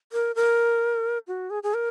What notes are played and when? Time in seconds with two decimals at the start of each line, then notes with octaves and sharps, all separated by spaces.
0.13 A#4
0.36 A#4
1.27 F#4
1.50 G#4
1.63 G#4
1.74 A#4